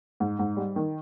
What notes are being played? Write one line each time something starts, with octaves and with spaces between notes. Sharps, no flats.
G#2
G#2
G3
D#3